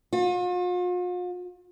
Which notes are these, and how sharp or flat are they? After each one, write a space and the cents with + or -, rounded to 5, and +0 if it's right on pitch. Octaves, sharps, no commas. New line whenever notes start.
F4 +45